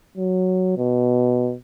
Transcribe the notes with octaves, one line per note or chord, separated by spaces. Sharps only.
F#3
B2